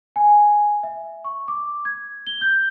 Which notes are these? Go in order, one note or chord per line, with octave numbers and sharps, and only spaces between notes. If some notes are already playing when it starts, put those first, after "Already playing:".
G#5
E5
C#6
D6
G#6
G7
G6